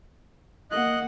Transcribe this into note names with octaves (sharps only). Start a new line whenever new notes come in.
A#3 D#5 F#5 F#6